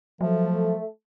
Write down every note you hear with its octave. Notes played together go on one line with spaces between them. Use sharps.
F3 F#3 A3